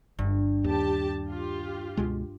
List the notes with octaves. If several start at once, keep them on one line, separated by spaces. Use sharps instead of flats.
G1 G2
D#2 G4 A5
F4 G4
C#2 B2 G#3